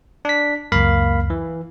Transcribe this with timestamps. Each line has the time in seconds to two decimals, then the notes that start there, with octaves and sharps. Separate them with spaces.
0.25 D4 B6
0.72 C#2 F#2 A#3 F5 B5
1.30 E3